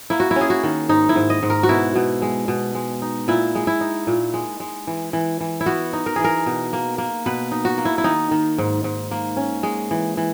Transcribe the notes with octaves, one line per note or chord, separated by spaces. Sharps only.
A#3 E4
F#4
E4
C#4 G#4
F#4
D#3
G#2 D#4
E4
G#2
D#5
G#2
A#4
F#4
B2 E4
B2
G#3
B2
G#3
D#4
A#2 E4
G#3
E4
D#4
A#2
G#3
G#3
E3
E3
E3
E4
B3 F#4
D#4
A#4
E3 G#4
A#4
B2
A#3
A#3
B2 B4
D#4
F#4
A#3
E4
E4
D#3 D#4
D#3
G#2
G#2
A#3
C#4
G#3
E3
E3